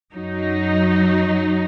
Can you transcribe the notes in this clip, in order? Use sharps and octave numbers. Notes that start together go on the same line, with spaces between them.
F#2 F#3 D#4